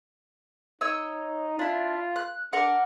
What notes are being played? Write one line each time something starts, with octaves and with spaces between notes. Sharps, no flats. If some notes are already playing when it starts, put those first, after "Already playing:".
D#4 C#5 D#5 E6
D4 E4 F4
F#6
D4 A#4 F#5 D6